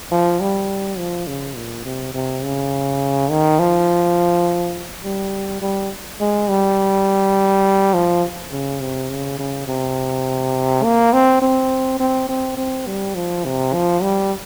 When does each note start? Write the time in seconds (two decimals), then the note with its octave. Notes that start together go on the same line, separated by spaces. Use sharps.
0.11 F3
0.40 G3
0.98 F3
1.27 C#3
1.56 A#2
1.85 C3
2.14 C3
2.44 C#3
3.30 D#3
3.60 F3
5.04 G3
5.62 G3
6.20 G#3
6.49 G3
7.94 F3
8.52 C#3
8.81 C3
9.10 C#3
9.39 C#3
9.68 C3
10.83 A#3
11.13 C4
11.42 C4
12.00 C4
12.29 C4
12.57 C4
12.87 G3
13.15 F3
13.45 C3
13.73 F3
14.02 G3